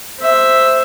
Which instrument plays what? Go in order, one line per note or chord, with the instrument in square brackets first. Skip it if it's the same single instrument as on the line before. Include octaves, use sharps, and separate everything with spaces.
[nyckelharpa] C5 E5